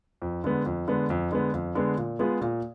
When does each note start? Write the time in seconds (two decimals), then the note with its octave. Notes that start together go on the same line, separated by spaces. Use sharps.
0.22 F2
0.44 D3 G#3 B3
0.66 F2
0.88 D3 G#3 B3
1.10 F2
1.31 D3 G#3 B3
1.54 F2
1.75 D3 G#3 B3
1.97 A#2
2.19 G#3 B3 F4 G#4
2.41 A#2